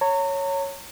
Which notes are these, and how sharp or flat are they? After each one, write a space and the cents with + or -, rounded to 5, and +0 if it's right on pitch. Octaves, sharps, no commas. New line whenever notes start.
C#5 +0 A#5 -35